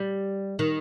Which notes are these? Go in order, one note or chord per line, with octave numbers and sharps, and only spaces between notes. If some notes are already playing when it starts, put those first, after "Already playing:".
Already playing: G3
D#3